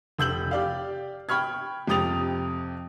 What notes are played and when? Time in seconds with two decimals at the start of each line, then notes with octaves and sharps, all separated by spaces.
0.18 F1 E6 G6 F#7
0.51 G4 D5 F5
1.29 G5 B5 C#6 F6 G#6
1.87 F2 C3 G5 D#6 A6 F7